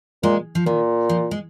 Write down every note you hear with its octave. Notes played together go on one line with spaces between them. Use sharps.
A#2 G#3
F3
A#2 D#3
F3
G#3